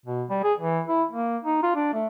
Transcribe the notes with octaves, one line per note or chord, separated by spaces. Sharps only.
B2
G3
G#4
E3
E4
A#3
D#4
F4
D4
A3